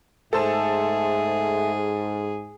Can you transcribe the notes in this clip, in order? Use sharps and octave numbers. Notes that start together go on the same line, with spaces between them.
G#2 A3 G#4 A4 C5 A5